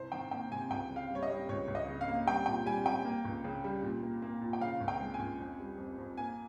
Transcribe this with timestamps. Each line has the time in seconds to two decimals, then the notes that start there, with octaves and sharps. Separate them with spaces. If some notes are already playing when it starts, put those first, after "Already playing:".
Already playing: C2 C5
0.12 D#3 G5
0.31 A#3 G5
0.51 C3 G#5
0.70 C#2 G5
0.90 C#3
0.96 F5
1.10 G3 C#5
1.23 D#5
1.30 G3
1.49 C#2 C#5
1.68 C#2
1.75 D#5
1.88 C#3
2.01 F5
2.08 A#3
2.27 G3 G5
2.46 A#2 G5
2.66 G3 G#5
2.85 G3 G5
3.05 A#3
3.25 C#2
3.44 C#3
3.64 G3
3.83 A#2
4.03 A#3
4.22 A#3
4.41 A#2
4.53 G5
4.61 C#3 F5
4.81 C#2
4.88 G5
5.00 G#3
5.14 G#5
5.19 C#2
5.40 F2
5.60 G3
5.78 F2
5.98 F2
6.17 A#3 G#5